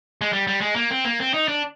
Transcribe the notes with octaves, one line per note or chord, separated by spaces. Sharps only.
G#3
G3
G3
G#3
A#3
C4
A#3
C4
D#4
D4